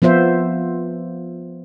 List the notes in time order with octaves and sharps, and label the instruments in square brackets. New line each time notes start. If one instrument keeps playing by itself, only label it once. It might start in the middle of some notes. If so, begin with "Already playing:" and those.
[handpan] F3 B3 F4 C5 E5